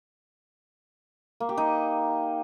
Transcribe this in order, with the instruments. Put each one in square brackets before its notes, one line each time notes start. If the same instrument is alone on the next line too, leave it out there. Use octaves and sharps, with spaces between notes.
[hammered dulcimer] A#3
G4
D#4